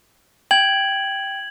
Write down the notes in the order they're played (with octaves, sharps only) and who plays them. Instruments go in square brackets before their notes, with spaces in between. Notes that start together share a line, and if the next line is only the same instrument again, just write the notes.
[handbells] G5 [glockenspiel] G#6 F#7